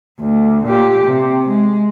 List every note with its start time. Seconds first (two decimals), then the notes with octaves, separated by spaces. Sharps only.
0.19 D2
0.65 A#2 G4
1.04 C3
1.49 G#3